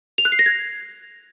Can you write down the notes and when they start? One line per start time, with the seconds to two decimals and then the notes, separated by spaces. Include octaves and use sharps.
0.18 F7
0.25 F#6
0.32 C7
0.39 A#6
0.46 G#6